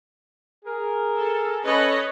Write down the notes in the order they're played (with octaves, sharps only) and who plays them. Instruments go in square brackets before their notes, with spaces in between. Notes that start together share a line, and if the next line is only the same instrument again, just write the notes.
[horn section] G#4 A#4
[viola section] A4
[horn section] C#4 A4 [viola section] B4 C#5 D#5